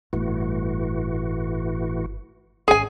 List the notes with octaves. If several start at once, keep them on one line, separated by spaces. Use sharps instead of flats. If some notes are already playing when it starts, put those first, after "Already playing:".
G1 A2 E3 A3 F#4
G#1 D#3 C#4 G#4 G#5